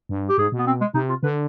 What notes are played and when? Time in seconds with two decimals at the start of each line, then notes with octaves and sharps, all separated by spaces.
0.09 G2
0.29 G4
0.38 G#2 G#4
0.52 B2
0.59 B3
0.67 C4
0.81 G#3
0.94 C3 D#4
1.09 F4
1.23 D3 B4